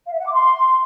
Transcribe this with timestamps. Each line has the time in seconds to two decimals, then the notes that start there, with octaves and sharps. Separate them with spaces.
0.06 F5
0.13 E5
0.19 F#5
0.26 D6
0.33 C6